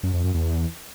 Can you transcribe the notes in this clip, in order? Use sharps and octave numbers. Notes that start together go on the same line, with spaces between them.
F#2
F2
F#2
E2